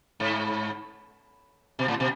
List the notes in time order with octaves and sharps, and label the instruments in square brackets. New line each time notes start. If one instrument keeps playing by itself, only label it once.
[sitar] G#2
B2
A2
B2